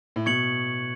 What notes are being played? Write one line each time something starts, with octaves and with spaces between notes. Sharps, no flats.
A2
B2 C#6 G#6 C#7 F#7